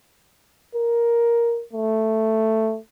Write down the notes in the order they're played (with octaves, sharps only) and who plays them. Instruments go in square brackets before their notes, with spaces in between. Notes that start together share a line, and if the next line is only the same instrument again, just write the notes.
[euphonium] A#4
A3